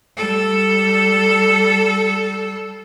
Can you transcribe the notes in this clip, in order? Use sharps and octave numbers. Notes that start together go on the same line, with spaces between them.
G3 A4